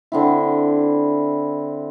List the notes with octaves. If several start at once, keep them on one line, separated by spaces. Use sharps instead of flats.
D3 C4 E4